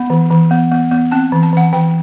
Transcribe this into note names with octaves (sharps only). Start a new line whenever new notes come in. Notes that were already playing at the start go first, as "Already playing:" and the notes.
Already playing: B3 B5
E3
E3
B3
B3
B3
C4 A5
E3
A5
E3 F#5
E3 G5